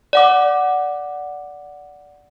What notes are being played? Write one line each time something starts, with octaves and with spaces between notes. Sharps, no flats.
D5 F#5 D6